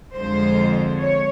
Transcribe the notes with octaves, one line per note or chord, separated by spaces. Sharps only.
F2 D3 F3 G#3 C5
C#5